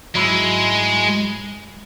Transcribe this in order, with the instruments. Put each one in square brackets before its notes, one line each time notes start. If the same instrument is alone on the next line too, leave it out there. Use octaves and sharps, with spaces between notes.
[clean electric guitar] G#2 F#3 E4 [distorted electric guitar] G#3